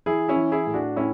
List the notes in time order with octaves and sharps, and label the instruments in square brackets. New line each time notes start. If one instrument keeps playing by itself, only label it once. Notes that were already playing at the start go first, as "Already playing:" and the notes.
[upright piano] E3 E4 G#4
C#4 E4
E3
E4 G#4
A2
D4 F#4
A2 C#4 E4